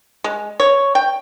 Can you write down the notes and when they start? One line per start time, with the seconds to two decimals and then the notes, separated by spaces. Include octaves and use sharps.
0.24 G#3
0.60 C#5
0.95 G5